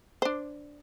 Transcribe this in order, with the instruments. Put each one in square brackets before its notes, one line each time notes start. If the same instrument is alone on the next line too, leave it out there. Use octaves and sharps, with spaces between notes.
[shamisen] D4 C5